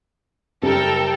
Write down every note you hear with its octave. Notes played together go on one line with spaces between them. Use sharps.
F#1 G3 A4 A#4 G5